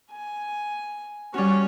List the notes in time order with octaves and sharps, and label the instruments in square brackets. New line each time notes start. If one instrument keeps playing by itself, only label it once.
[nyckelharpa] G#5
[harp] G3 F#4 [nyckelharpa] C#4 C#5